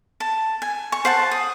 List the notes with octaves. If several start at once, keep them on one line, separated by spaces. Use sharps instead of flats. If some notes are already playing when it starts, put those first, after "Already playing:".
A5
G#5
C#6
C5 F#5 A5
D#6